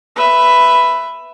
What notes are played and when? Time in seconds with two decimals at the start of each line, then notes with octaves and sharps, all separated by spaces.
0.17 B4 E5